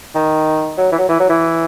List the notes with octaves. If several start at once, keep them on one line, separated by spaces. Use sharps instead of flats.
D#3
F#3
E3
F#3
E3
F#3
E3